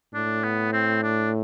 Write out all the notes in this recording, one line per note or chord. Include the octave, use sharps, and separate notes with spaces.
A2 D4
B3
C4
D4